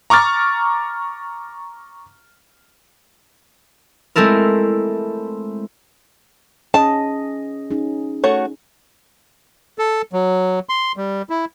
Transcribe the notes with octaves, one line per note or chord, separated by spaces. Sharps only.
A#5 C#6 D6 F6 A6
G#3 A3 C4 E4 A4 A#4
C#4 G#4 D#5 A5
C#4 D#4 G#4
A3 F#4 C#5
A4
F#3
C6
G3
E4